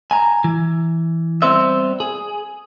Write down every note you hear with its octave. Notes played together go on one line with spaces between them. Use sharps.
G#5 A#5
E3
G3 B3 C4 C5 E5
G#4